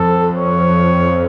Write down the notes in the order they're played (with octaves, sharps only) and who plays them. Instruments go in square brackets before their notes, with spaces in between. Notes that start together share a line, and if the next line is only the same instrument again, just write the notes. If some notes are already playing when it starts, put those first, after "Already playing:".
Already playing: [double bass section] F2 [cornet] A4
[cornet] C#5